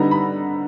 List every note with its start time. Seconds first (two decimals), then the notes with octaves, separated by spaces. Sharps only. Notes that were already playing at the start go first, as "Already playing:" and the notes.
Already playing: D3 G3 B3 D#4 A#5
0.11 B5